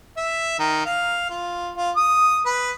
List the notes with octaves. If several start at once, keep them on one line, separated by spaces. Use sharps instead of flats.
E5
D#3
F5
F4
F4
D#6
B4